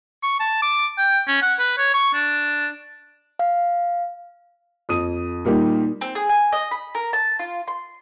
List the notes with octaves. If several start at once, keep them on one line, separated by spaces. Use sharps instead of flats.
C#6
A5
D6
G5
C#4
F#5
B4
C#5
C#6
D4
F5
F2 D#6 D#7
A#2 G3 A#3 D#4 G4
C4
G#4
G#5
D#5
B5
A#4
A5
F4
C6